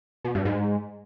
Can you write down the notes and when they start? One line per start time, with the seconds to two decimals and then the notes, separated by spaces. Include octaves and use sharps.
0.25 B2
0.35 G2
0.45 G#2